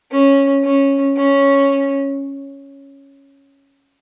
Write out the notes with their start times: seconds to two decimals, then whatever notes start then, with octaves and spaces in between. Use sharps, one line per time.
0.11 C#4
0.63 C#4
1.16 C#4